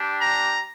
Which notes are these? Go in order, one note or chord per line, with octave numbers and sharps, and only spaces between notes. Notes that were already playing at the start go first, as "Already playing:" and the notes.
Already playing: G3 D4 G4
A#5